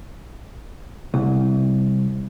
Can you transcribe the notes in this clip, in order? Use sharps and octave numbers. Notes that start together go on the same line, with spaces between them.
C2